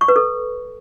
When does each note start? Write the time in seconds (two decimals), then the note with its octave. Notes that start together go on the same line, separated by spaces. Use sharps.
0.01 C#6
0.08 B4
0.16 A4